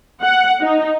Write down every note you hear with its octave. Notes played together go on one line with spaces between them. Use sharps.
F#5
D#4